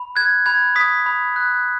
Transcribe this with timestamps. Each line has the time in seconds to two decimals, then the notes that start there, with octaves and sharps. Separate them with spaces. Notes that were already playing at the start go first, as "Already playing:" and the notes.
Already playing: B5
0.16 F#6 G#6
0.46 B5 G#6
0.76 D#6 B6
1.06 B5
1.36 F#6